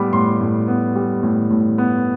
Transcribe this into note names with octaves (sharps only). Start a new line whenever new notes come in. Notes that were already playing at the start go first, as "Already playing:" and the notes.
Already playing: A2 G3 B3 B5 D6
A2 C6
A2
B3
G3
A2
A2
B3